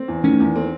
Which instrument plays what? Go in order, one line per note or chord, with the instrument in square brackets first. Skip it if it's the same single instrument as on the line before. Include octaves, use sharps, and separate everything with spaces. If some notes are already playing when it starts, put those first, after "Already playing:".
Already playing: [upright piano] C4
E2
[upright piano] D#3 [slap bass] A3 C#4
[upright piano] E2
C4